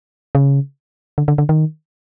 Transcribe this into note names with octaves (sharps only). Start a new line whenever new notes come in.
C#3
D3
D3
D3
D#3